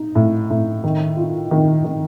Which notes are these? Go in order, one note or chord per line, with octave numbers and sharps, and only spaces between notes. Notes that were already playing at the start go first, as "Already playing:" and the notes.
Already playing: D#4
A2
A2
D#3
F4
D#3
D#3